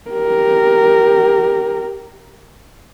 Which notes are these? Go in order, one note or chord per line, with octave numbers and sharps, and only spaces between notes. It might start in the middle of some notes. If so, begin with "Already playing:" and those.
G4 A#4